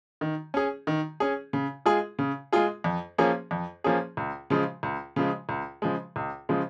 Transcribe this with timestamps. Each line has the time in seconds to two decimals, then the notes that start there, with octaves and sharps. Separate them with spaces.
0.21 D#3
0.54 C#4 G#4
0.87 D#3
1.20 C#4 G#4
1.53 C#3
1.86 G#3 F4 G#4
2.19 C#3
2.53 G#3 F4 G#4
2.84 F2
3.18 F3 A#3 C#4 G#4
3.51 F2
3.84 F3 A#3 C#4 G#4
4.17 C#2
4.50 C#3 F3 G#3
4.83 C#2
5.16 C#3 F3 G#3
5.49 C#2
5.82 C#3 F3 G#3
6.16 C#2
6.49 C#3 F3 G#3